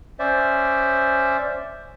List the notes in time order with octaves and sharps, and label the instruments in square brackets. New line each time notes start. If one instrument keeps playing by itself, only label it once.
[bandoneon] C#4 C5 D5 E5